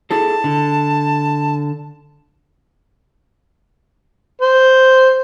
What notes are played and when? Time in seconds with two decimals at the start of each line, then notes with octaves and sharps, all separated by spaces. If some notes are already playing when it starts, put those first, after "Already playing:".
0.11 E4 G#4 A4 A5
0.44 D3
4.41 C5